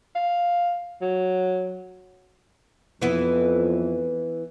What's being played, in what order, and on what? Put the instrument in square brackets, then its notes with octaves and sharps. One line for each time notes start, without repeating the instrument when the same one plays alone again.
[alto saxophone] F5
F#3
[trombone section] F2 [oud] E3 B3 E4